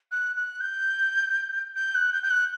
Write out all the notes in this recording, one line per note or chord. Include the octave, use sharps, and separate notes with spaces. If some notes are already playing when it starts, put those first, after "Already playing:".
F#6
F#6
G6
G6
F#6
G6
G6
F#6